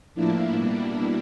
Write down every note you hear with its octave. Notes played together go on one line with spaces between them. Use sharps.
A2 F3 A#3 D4 E4
B2 G3 A#3 D4 E4